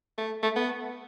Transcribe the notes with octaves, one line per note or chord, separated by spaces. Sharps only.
A3
A3
B3